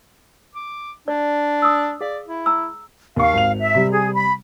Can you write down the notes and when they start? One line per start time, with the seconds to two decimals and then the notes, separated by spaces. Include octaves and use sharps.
0.55 D6
1.08 D4 D5
1.62 D#6 E6
2.01 G#4 D5 F5
2.27 E4
2.46 A#5 E6
3.16 D#2 F5 C#6
3.34 G#1 F7
3.60 E5
3.75 C3 G3
3.92 G#4
4.13 B5